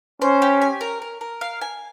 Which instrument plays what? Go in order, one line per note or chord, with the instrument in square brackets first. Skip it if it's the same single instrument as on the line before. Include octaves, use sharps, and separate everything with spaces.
[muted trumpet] C#4 [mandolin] C5
[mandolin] G4
G#5
A#4
A#4
A#4
F5
G#5